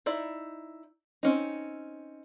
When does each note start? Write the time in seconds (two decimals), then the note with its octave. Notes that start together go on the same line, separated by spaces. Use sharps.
0.06 D#4 E4 D5
1.23 C4 C#4 D#4